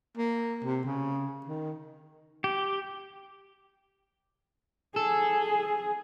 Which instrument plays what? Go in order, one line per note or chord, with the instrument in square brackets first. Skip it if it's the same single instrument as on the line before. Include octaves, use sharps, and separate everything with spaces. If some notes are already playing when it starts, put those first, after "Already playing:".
[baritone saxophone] A#3
C3
C#3
D#3
[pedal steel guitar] G4
[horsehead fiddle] G#4 [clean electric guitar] A4